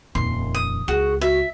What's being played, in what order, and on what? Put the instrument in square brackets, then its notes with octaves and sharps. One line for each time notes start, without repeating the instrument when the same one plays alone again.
[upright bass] D#1 F2 [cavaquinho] C6
[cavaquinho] D#6
[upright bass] C#2 [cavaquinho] F#4 [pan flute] G#4
[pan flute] F#4 [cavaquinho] E5